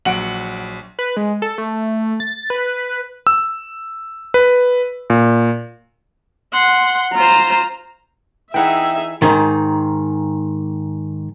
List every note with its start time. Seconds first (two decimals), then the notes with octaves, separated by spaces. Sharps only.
0.05 A#1 F#3 F#5 D7 F#7
0.99 B4
1.17 G#3
1.42 A4
1.58 A3
2.20 A6
2.50 B4
3.27 E6
4.34 B4
5.10 A#2
6.53 F#5 C6
7.14 F4 C5 A#5
8.54 E3 D#4 G#4 E5 F#5 G5
9.22 G#2 D#3